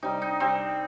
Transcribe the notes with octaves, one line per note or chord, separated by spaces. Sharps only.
C3 G3 D#4
D#4
C3 G3 C4